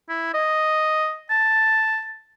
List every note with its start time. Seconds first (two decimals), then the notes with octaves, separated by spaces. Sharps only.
0.09 E4
0.34 D#5
1.30 A5